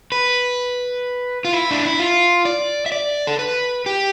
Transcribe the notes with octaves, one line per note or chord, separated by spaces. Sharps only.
B4
F4
E4
D4
E4
F4
D5
E5
D5
A4
B4
G4